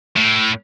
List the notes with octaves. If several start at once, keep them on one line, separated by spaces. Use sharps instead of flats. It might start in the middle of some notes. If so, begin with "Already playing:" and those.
A2